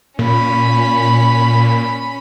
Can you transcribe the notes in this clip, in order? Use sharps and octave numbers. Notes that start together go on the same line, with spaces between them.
A#2 C#4 B5